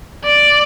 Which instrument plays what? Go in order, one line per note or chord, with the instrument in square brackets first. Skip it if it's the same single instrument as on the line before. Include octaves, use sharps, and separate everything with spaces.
[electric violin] D5